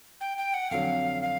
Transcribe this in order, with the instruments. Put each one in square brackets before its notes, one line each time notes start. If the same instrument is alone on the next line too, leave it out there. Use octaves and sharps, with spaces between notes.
[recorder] G5
G5
F#5
[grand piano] F2 D3 F#3 [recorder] F5
[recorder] F5